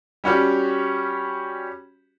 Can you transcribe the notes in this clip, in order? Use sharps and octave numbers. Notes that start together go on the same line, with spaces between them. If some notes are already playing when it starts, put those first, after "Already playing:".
G3 C#4 F#4 G4